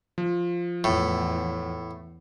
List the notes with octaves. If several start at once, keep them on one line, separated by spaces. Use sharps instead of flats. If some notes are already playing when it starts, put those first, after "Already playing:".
F3
E2 A2